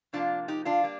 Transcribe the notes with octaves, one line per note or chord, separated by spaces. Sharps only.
C3 F3 A#3 D4 F4
D#4 G4
D4 F4
G3 A#3